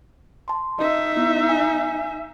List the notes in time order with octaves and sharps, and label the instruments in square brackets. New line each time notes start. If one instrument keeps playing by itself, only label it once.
[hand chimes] A5 C6
[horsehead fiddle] D#4 E5 [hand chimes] D#5
[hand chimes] B3 E4
G#5